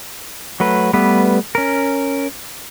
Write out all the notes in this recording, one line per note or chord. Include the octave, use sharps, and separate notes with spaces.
F#3 A3 B4
G3 A3 B3 B4
C#4 A#4